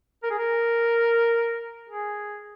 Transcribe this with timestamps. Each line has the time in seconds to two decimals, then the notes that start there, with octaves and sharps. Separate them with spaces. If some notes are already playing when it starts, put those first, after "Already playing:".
0.23 A#4
0.31 G#4
0.39 A#4
1.89 G#4